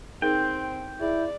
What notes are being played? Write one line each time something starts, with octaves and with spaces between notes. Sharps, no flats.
C4 D#4 G#4 A#4 G5
E4 G#4 D5